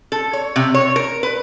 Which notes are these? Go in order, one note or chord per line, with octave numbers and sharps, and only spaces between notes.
A4
C#5
C3
C#5
A#4
B4